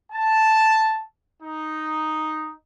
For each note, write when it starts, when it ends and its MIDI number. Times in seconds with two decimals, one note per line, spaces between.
0.13 1.03 81
1.43 2.51 63